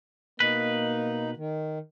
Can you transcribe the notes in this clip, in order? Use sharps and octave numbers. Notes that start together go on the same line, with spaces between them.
B2 A#3 D#4 B4
D#3